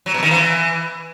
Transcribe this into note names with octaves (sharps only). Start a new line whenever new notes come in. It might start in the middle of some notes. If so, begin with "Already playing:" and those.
F#3
B2
D#3
E3